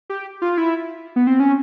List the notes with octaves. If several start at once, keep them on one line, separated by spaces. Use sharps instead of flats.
G4
F4
E4
B3
C4
C#4